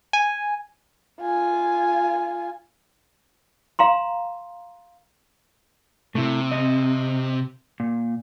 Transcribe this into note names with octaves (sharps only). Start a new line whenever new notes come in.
G#5
F4 G#5
F5 A#5 C6
C3 A3 E4
C4 D#5
A#2